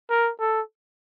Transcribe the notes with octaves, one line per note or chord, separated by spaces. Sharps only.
A#4
A4